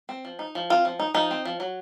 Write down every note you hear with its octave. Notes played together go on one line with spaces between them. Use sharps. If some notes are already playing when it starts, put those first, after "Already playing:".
C4
F3
D#4
F3
C4 F4
F3
D#4
F3 D#4
C4
F3
F#3